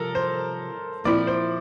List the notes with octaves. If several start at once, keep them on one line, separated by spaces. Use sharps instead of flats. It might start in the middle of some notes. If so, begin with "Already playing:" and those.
Already playing: C3 F3 A4 A#4
C5
A#2 F3 C4 E4 D5
C5